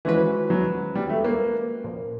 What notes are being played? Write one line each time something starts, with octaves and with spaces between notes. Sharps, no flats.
E3 F3 G#3 C#4 F#4 B4
F#3
G3
A3
A#3
A#2 F3 A#3